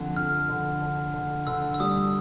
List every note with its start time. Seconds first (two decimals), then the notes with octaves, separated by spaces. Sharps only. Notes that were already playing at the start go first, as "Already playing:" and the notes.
Already playing: F2 D3
0.16 F2 F6
0.49 D3
0.82 D3
1.14 D3
1.47 D3 E6
1.74 E6
1.80 G3 D#6